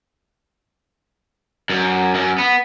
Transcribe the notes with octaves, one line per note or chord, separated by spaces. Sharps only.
F#2
F#2
B3